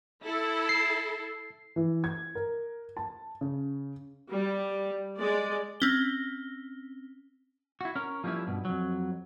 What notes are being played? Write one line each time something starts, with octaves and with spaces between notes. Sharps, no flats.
E4 A4
C7
E3
G#6
A#4
A5
C#3
G3
G#3 D5
C4 C#4 G7
E4 F#4
C#4 A#4
F3 G3 A#3 C#4 E4
G2 B2
F2 F#3